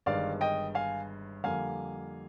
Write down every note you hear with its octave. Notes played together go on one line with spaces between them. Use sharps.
G1 G2 D#3 G#3 D5 F5
D#5 G5
F5 G#5
F2 D3 G3 A#3 F5 G#5